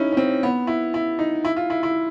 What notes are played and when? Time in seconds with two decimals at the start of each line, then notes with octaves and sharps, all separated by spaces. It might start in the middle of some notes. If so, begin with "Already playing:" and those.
Already playing: C#4 D#4 E4
0.12 C#4
0.17 C4
0.43 B3
0.67 E4
0.94 E4
1.19 D#4
1.45 E4
1.56 F4
1.70 E4
1.83 E4